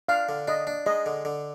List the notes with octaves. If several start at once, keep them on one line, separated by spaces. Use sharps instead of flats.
D4 F5
D3
D4 D#5
D4
G#3 D#5
D3
D3